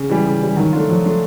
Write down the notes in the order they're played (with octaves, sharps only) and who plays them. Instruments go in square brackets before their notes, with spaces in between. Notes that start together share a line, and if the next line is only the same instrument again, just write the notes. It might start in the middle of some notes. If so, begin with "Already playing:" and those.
Already playing: [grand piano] C#3
E3 G3
C#3
E3 G3
[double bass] D#3 [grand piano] F#3
[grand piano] A3 D4 F4
[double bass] F3 [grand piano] F#3
[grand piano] A3 D4 F4